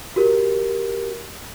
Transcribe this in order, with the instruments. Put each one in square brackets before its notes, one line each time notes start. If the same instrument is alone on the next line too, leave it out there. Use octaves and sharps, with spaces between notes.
[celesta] F#4 G4 A#4